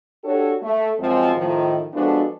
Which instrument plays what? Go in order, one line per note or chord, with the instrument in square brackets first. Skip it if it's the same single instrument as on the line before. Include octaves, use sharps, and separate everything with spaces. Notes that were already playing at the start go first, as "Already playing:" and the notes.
[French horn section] D4 F#4 G4 A4 C#5
A3
F#2 F3 G#3 C4
A2 D#3 F3
F3 G#3 B3 D4 F#4 A4